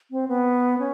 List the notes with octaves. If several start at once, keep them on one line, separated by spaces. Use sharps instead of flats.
C4
B3
C#4